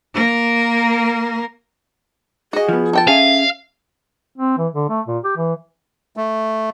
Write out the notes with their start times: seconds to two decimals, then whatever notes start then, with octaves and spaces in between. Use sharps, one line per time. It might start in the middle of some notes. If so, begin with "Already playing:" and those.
0.14 A#3 A#4
2.53 F#4 G#4 D#5
2.69 F3 B3
2.93 A4 G5 A5
3.08 C#4 G#4 E5 F5
4.38 C4
4.58 E3
4.74 D3
4.90 A3
5.08 A#2
5.24 G4
5.37 E3
6.17 A3